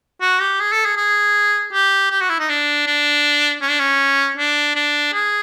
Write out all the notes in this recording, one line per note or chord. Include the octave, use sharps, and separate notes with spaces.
F#4
G4
G#4
A4
G#4
G#4
G4
G4
F#4
E4
D#4
D4
D4
C#4
D4
C#4
D4
D4
G#4